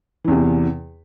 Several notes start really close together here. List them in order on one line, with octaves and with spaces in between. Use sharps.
E3 E2 C3